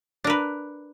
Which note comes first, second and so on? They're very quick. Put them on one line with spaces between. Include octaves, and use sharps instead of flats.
D4 A#4 B4